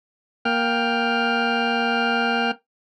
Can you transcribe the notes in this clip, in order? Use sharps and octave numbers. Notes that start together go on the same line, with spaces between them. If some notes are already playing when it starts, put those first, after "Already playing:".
A#3 G5 F6